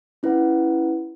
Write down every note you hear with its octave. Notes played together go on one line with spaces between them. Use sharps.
C#4 E4 B4 F#5